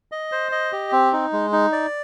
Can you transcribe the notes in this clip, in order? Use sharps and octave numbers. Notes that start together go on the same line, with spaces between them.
D#5
C5
D#5
G4
C4
D#4
G#3
D#4
D5